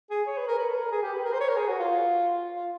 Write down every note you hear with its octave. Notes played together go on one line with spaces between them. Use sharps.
G#4
C#5
B4
A#4
B4
A4
A#4
G#4
G4
B4
A#4
C5
C#5
A#4
G#4
F#4
F4
F4